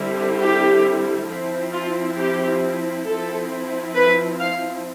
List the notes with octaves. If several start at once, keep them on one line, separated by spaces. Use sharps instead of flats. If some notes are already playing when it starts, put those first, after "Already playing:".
Already playing: D3 G3 C4 E4
G4
F3 C4 E4
F4
G4
F3 C4 E4 A4
B4
F5